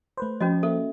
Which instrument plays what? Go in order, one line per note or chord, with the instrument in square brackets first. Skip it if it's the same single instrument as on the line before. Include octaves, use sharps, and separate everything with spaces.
[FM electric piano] A3 B4 C5
[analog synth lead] F3 [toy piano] C#4 F#4 D#5
[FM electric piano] A#3 [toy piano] A4 [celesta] E5